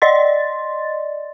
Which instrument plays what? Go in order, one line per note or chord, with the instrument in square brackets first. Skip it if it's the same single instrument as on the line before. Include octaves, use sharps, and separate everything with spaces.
[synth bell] D5 D#5 C6 A6